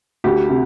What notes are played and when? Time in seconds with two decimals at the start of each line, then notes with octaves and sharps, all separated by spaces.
0.24 D2 G4
0.50 C3